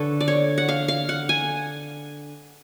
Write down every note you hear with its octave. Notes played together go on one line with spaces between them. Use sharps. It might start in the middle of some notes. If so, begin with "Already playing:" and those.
Already playing: D3 A4 B4 C#5
D5
C#5
F#5
F5
F5
F#5
G#5